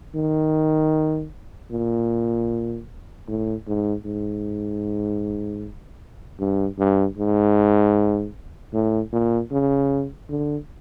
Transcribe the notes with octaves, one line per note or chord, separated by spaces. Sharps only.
D#3
A#2
A2
G#2
G#2
G2
G2
G#2
A2
A#2
C#3
D3